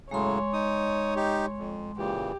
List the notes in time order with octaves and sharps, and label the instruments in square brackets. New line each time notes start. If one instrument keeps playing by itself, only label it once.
[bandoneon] A2 C#3 F#3 [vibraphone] G#3 C6 [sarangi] C#5
[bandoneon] D#4 D#6
D#4 G4
F2
[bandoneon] A#2 C#3 E3 [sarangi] G4